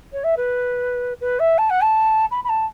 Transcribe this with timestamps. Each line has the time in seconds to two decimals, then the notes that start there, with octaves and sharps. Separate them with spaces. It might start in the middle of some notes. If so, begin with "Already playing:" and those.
0.13 C#5
0.24 E5
0.37 B4
1.21 B4
1.39 E5
1.58 A5
1.70 F#5
1.82 A5
2.31 B5
2.44 B5
2.49 A5